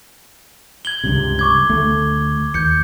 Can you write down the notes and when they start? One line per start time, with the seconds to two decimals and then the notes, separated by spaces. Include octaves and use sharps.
0.85 G#6 F#7 G7
1.04 C#2 G2 C3
1.39 C#6 D6 G#6
1.69 D2 A3
2.54 D#2 G6 C#7